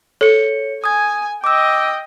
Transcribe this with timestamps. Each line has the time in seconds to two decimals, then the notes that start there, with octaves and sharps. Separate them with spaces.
0.21 A4 C#5 C#7
0.84 G#5 D#6 G#6
1.44 D#5 G5 D6 E6